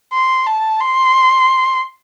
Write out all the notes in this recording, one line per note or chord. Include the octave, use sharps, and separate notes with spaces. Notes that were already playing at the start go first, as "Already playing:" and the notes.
C6
A5
C6